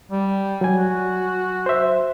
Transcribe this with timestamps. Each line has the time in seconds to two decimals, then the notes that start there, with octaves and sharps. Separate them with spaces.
0.11 G3
0.61 F#3 G#5
0.77 F#4
1.66 C5 E5